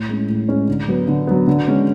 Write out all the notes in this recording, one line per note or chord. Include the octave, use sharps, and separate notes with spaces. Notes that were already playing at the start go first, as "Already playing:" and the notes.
Already playing: A2
G#3 C#4
A2
G#3 C#4
D3
F#3 B3
D3
F#3 B3
D3
G#3 C#4